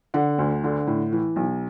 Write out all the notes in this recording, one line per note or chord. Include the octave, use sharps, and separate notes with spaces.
D3 F#5
D2
D3
A2
E3
B1